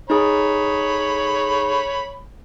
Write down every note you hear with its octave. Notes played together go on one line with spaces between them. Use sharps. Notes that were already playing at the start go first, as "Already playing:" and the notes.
D#4 G#4 C#5 B5